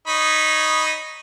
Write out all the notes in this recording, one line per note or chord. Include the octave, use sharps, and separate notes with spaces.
D#4 C#5 B5